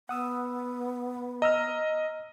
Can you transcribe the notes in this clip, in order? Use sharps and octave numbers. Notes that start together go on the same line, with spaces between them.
B3 F#5 D#6 E6
D#5 A#5 E6 F6